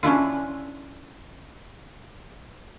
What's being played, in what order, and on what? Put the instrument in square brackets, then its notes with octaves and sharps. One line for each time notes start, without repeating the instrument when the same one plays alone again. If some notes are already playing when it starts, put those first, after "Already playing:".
[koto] C#4 D4 E4 F4